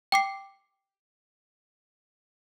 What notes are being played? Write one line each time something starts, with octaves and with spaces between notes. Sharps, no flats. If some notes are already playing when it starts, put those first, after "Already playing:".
G5 D6 C7